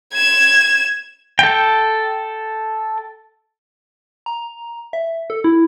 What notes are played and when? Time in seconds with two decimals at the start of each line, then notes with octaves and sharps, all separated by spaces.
0.13 G#6 E7
1.39 A4 G5
4.26 A#5
4.93 E5
5.30 A4
5.44 E4